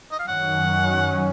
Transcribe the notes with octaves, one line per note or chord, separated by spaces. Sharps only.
D#5
F5
F#2 D#3 F#3 C#4 F#5